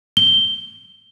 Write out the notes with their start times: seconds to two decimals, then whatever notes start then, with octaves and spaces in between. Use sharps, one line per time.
0.17 G7